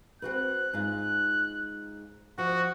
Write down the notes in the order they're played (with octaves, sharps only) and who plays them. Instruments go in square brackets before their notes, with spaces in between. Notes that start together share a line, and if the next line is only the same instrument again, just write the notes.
[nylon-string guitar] C4 F#4 B4 [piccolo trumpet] F#6
[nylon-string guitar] G#2 F4 [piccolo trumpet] F#6
[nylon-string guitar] F3 [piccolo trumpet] F#4